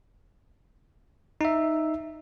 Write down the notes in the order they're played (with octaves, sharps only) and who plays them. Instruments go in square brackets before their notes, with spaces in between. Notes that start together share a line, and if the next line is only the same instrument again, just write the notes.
[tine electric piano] D#4 E5